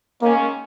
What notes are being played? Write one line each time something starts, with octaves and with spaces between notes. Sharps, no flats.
D#3 G#3 A#3 C#4